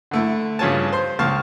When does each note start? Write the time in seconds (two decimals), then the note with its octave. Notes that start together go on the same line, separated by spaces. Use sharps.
0.11 D3 A3 E4
0.59 G2 C#3 F4 C#5 G#5 A5
0.92 C5 C6
1.19 C#2 F5 A5 C#6 F6